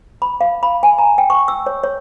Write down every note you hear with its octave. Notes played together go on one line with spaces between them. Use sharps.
B5
F5
B5
G#5
A#5
G5
C#6
E6
C#5
C#5